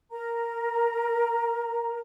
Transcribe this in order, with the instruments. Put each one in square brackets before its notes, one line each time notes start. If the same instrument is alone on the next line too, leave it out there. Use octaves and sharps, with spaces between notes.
[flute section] A#4 A#5